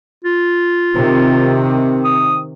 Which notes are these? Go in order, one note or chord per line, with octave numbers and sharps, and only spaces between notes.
F4
C3 D#3
D#6